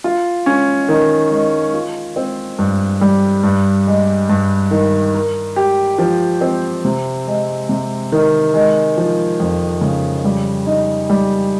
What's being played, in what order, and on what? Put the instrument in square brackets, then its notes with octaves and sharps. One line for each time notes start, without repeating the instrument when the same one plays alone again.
[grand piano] F4
C#4
D#3
G#3
F4
C4
G2
G3
G2
G#3
G2
D#3
A#4
G4
F3
C4
C3
G#3
C3
D#3
G#3
F3
F2
C#3
G3
D#4
G3